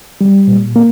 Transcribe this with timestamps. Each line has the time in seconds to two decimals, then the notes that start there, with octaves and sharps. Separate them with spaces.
0.21 G3
0.48 A#2
0.76 A#3